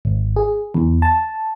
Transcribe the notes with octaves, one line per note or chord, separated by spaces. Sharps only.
G#1
G#4
E2
A5